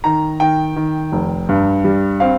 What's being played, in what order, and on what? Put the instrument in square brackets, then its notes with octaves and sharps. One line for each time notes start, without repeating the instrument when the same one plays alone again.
[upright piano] D#3 A#5
D#3 G5
D#3
F1
G2
G3
C4 F5